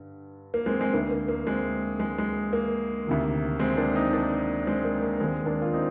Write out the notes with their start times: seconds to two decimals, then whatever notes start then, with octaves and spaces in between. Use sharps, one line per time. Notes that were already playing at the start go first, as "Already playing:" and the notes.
Already playing: G2 D3
0.54 A#3
0.66 G#3 C4
0.79 G#3 C4
0.93 D2 D3 A#3
1.11 A#3
1.28 A#3
1.47 G#3 C4
2.00 G#3
2.18 G#3
2.53 A#3
3.07 D2 C3 D#3
3.59 G#3 C4
3.77 A#3 D4
3.95 C4 D#4
4.13 A#3 D4
4.67 G#3 C4
4.84 A#3
5.02 A#3
5.20 D#2 D#3 G#3 C4
5.46 A#3 D4
5.62 F4
5.73 C4 D#4